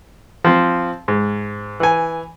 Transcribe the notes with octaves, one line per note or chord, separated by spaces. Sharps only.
F3 C4
G#2
E3 G#5